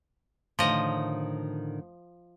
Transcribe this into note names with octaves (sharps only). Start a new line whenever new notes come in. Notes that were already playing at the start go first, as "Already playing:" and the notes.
A2 D3 D#3 F3 D#5